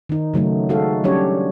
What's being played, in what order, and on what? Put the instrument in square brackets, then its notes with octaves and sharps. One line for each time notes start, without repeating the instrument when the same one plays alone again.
[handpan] D#3 D#4
C#3 F#3 A3 D#4
G#3 D#4 F#4 A4 F5
F#3 G3 C#4 D4 G4 C#5